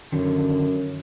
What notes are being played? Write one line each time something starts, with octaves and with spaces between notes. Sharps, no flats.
F#2 D3 D#3